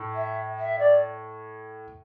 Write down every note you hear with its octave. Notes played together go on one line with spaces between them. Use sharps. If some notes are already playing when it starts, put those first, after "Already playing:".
Already playing: A2
E5
E5
D5